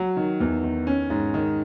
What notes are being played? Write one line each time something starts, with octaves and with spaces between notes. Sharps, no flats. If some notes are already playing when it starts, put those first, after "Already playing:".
Already playing: F#3
D#3
E2
D#3
C#4
G#2
D#3